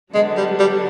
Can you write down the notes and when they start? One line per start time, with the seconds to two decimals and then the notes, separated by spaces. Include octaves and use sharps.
0.14 D3 F#3 G#3 B3 D4
0.37 G3
0.59 G3